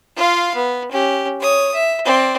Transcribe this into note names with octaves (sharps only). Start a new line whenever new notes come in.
F4 F5
B3
C#4 G4
C#5 D#6
E5
C4 D5